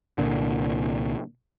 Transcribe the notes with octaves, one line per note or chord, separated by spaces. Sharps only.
C2 A#2 D3